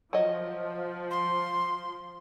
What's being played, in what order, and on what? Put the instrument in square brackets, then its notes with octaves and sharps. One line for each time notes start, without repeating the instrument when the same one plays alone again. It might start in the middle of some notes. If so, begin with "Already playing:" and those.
[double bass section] F3 [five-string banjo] F#3 D#5
[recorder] C6